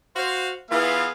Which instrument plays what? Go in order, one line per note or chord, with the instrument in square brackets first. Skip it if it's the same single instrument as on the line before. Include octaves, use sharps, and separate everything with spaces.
[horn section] F#4 C5 F5
[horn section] E3 F4 [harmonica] B3 G#4 F5